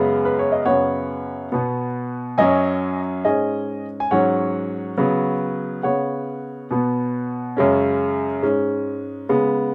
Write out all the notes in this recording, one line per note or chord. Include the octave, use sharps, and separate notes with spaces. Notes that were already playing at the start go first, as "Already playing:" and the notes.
Already playing: F#2 C#3 G#3 B3
B4
C#5
D#5
F#2 C#3 B3 C#5 F#5
B2 B3
F#2 F#3 C#4 D#5 G#5
G#2 G#3 C#4 D#5 G#5
G#5
G#2 F#3 C#4 C#5 F#5
C#3 F#3 B3
C#3 B3 C#5 F#5
B2 B3
F#2 C#3 G#3 C#4
G#2 G#3 C#4
C#3 G#3 B3